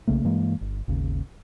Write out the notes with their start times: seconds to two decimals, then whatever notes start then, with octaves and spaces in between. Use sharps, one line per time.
0.07 B1 C#3 A3 A#3
0.24 G2 E3 G#3 A#3
0.61 G1
0.88 G#1 D#2 C#3